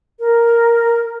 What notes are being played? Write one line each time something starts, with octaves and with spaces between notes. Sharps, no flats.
A#4